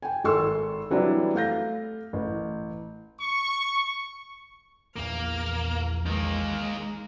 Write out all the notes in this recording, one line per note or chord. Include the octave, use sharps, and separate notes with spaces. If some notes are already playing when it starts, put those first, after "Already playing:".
G5 G#5
G#1 A4 C6 C#6 E6
E3 F#3 G3 C4 D4 E4
A3 F5 G6 A#6
A1
C#6
A#1 E2 A#3 F6
D#3 G#3 A#3